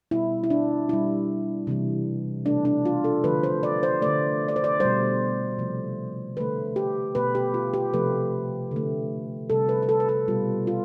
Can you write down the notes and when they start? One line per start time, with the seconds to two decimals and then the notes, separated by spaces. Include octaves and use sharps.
0.11 B2 G3 E4
0.44 E4
0.50 D4
0.89 B2 G3 E4
1.67 C3 E3 G3
2.45 A3 D4
2.50 B2
2.65 D4
2.85 F4
3.04 A4
3.24 D3 F3 A3 B4
3.43 C5
3.63 D5
3.83 C5
4.02 D3 A3 D5
4.48 D5
4.56 C5
4.64 D5
4.80 B2 G3 C5
5.59 C3 F3 A3
6.37 D3 A3 B4
6.76 G4
7.15 B2 A3 B4
7.35 G4
7.54 F4
7.74 G4
7.93 C3 F3 A3 B4
8.71 D3 A3
9.50 C3 G3 A4
9.69 B4
9.83 B4
9.89 A4
10.00 B4
10.09 A4
10.28 B2 G3 F4
10.67 F4